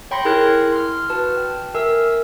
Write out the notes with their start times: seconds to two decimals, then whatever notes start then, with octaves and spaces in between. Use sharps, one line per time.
0.11 C#5 G5 B5 C6 A#6 C#7
0.25 E4 G#4 A#4 D#6 F#6 G#6
0.72 C6 F6
1.09 F#4 B4 A5 F6
1.37 G5
1.74 A#4 E5 G#5 E6